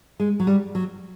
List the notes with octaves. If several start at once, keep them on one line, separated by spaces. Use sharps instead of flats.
G#3
F#3
G3
F#3